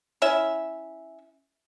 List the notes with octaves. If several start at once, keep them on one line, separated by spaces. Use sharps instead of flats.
C#4 E4 E5